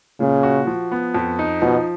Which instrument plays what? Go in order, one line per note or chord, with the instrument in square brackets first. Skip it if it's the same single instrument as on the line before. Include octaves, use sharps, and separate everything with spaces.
[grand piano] A#2 [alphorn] C#3
[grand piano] F#4
F3
B3
F2
D#4
[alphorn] B2 [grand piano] F3